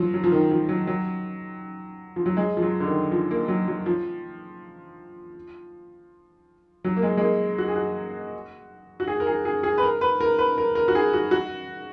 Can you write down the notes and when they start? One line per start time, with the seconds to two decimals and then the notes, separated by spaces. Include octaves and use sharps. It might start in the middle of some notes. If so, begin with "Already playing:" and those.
Already playing: F3 F#3
0.14 F#3
0.24 F3
0.32 D#3
0.51 F3
0.69 F#3
0.87 F#3
2.16 F3
2.26 F#3
2.37 G#3
2.57 F3
2.62 F#3
2.80 D3
2.87 D#3
3.12 F3
3.31 A#3
3.48 F#3
3.68 F#3
3.86 F3
6.84 F#3
6.96 A#3
7.03 G#3
7.17 G#3
7.21 A#3
7.58 F#4
7.68 G#4
7.76 F#4
9.00 F#4
9.07 G#4
9.20 A#4
9.27 G#4
9.45 G#4
9.63 G#4
9.78 B4
9.83 A#4
10.01 B4
10.21 A#4
10.39 B4
10.58 A#4
10.75 A#4
10.88 F#4
10.95 G#4
11.13 F#4
11.31 F#4